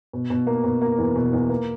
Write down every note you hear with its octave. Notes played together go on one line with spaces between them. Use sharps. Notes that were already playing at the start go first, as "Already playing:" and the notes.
B2
B2
A#3
B2
A#3
E2
B2
E2
A#3